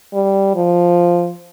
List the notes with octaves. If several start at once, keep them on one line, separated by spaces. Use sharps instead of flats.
G3
F3